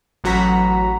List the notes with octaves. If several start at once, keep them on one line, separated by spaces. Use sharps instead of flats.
A1 F#3 F#4 A#5 B6